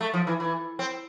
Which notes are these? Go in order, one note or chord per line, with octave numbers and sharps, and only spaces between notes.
A3
F3
E3
E3
C4